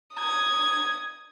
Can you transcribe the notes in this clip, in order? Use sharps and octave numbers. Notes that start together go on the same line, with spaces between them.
D#6 G#6